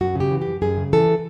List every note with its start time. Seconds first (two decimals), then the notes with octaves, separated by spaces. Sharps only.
0.01 F#2 F#4
0.15 C#3 G4
0.31 E3
0.42 G4
0.47 F#2
0.62 F#2 G#4
0.77 C#3
0.93 E3 A4